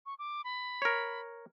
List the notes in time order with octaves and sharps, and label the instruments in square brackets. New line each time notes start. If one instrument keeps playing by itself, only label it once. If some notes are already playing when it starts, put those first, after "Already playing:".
[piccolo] C#6
D6
B5
[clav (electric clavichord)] A#4 C#5